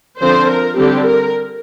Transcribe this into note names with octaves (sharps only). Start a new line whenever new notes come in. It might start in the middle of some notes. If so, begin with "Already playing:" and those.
D3 F3 C4 C5
A#4
D3 G3 C4 G4
A#4